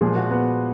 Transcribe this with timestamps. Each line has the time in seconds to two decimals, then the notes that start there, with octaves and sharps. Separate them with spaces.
0.01 A#2 F3 G#3 G#4
0.15 F#4
0.31 B3